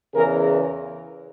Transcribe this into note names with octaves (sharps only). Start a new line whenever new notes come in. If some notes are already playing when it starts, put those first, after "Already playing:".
E2 C#3 E3 G#4 A#4